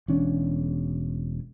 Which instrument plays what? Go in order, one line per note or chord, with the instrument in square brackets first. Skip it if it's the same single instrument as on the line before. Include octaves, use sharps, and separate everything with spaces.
[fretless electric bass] E1 E2 C#4 D4